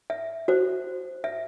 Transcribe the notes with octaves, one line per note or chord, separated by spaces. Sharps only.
E5
F#4 C5
E5